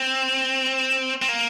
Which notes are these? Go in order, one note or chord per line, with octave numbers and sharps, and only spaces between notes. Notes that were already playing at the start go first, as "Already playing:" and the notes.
Already playing: C4
C4
A#3